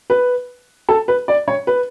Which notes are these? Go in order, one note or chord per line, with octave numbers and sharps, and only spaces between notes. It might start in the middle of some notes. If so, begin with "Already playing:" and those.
B4
A4
B4
D5
C#5
B4